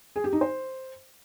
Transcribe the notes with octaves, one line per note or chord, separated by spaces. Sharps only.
G#4
G4
D#4
C5